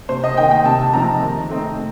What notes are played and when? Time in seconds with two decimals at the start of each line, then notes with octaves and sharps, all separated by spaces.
0.09 C3 C5
0.24 D#5
0.37 D#3 A#3 D#4 G5
0.51 G5
0.65 C3 A5
0.93 F3 C4 D#4 A#5
1.21 D#3
1.50 A3 C4 D#4